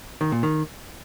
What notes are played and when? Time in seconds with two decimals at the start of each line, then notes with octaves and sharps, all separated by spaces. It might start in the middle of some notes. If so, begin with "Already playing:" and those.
0.21 D#3
0.32 A#2
0.43 D#3